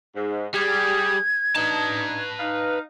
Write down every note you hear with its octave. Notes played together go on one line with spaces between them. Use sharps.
G#2
G3 G4 G#4 G#6
D4 D#4 B4 A5
D#4 F5